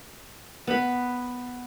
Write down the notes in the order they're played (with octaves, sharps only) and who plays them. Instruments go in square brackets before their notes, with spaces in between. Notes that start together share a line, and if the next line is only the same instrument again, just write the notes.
[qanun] B3 B5